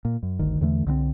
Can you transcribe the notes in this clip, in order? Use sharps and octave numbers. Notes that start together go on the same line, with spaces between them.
A#2
F#2
G1 D2 D#3
E2 D3 E3 A3
C2 D3 F3 C4